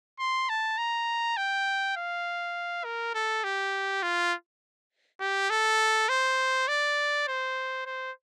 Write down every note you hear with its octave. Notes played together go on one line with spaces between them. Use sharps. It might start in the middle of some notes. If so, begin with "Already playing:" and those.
C6
A5
A#5
G5
F5
A#4
A4
G4
F4
G4
A4
C5
D5
C5
C5